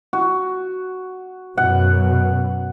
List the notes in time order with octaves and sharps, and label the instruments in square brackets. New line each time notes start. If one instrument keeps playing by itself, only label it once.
[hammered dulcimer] F#4
[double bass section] F#2 B2 [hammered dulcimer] F#5